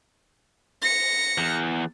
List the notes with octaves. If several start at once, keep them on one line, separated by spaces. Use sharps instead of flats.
A#6 C#7
E2